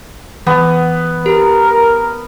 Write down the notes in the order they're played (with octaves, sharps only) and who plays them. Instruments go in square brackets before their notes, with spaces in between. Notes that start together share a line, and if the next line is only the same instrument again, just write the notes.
[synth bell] E3 [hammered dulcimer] B3
[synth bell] G4 [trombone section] A#4